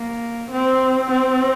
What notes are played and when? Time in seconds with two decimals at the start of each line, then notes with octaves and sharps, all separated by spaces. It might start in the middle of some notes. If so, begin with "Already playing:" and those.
Already playing: A#3
0.52 C4
1.11 C4